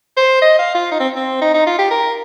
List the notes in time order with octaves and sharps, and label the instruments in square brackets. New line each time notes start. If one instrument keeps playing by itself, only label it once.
[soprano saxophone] C5
D#5
F5
F4
D#4
C4
C4
D#4
D#4
F4
G4
A#4